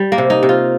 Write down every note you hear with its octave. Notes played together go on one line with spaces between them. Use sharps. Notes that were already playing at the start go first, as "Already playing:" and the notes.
Already playing: G3
A#3
C3
D#4
C3
F4